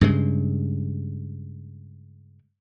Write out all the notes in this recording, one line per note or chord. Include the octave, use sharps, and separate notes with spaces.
G2 C#3 G#3